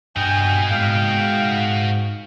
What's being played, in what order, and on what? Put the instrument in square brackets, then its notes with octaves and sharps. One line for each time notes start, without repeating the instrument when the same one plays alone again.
[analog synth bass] G2 [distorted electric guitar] F#4 D#5 [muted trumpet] G5 [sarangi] G#5
[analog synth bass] G#2 [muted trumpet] F5 [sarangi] G5